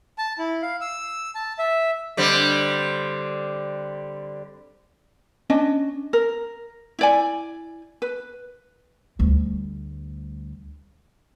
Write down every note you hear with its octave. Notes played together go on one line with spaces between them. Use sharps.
A5
E4
F5
E6
A5
E5
D3 G3 C4
C#4 D4 D#5
A#4
E4 D5 G#5
B4
D2 G3